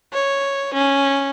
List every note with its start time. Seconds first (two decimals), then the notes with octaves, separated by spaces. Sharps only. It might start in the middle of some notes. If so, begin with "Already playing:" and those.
0.13 C#5
0.74 C#4